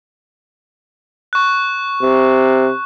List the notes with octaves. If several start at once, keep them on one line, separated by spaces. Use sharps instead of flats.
C#6 F#6
C3